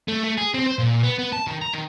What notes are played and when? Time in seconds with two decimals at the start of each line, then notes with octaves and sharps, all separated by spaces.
0.08 A3
0.24 A3
0.37 G#4
0.54 C4
0.66 C5
0.79 A#2
1.03 B3
1.18 B3
1.32 A5
1.47 D#3
1.61 A#5
1.73 D#3